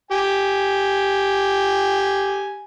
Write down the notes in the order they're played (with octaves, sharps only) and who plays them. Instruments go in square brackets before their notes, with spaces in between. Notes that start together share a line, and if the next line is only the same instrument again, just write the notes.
[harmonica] G4 G#5